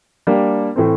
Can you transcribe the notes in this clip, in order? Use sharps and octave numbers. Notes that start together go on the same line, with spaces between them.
G3 A#3 D4
A2 E3 A3 C4